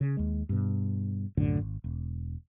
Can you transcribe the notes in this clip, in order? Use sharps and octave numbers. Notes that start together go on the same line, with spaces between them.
C#3
D#2 G#3
G2 B2
C2 F#2 A2 D3
G#1
E1